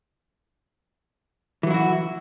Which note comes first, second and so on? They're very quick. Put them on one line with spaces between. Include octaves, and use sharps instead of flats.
E3 F#3 E4 F#4